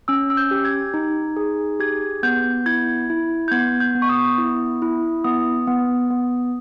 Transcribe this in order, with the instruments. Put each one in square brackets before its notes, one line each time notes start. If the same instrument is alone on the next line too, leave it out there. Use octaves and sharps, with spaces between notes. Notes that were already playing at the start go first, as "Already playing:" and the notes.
[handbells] C#4 E6
E6
G6
G4
G#6
D#4
G#4
G4 G#6
B3 G6
E4 G#6
E4
G6
B3 G#6
G6
B3
C#6
D#6
E4
E4
B3 D#6
B3
B3